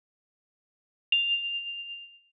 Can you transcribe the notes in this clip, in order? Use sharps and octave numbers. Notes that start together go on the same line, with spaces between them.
F7